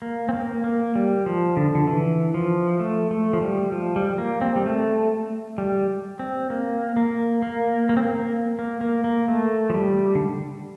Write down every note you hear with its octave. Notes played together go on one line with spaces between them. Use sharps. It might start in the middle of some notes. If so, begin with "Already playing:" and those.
A#3
C4
A#3
A#3
G3
F3
D3
D3
E3
F3
A3
A3
F3
G3
F3
G3
A#3
C4
G3
A3
G3
C4
A#3
A#3
A#3
A#3
C4
A#3
A#3
A#3
A#3
A3
F3
G3
D3